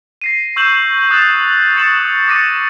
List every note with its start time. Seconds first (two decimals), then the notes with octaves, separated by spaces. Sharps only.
0.22 A#6 C7 D#7
0.56 C#6 E6 G6 E7 F#7
1.11 D#6 F#6 A6 E7
1.76 C#6 A6 C#7 E7 F#7
1.99 D#6
2.28 D6 D#6 A6 A#6 C#7 D#7